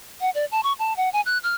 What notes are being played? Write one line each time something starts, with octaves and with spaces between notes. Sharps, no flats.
F#5
D5
A5
C#6
A5
F#5
G#5
F#6
F6